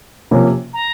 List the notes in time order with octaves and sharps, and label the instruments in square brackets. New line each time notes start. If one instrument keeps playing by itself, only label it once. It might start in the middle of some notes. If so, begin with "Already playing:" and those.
[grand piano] C3 F3 A#3 C#4
[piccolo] A#5